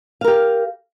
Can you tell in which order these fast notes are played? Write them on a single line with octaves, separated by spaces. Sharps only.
F5 A#4 G4